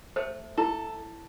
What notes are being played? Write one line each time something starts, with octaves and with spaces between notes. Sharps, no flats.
A3 C5
E4 A4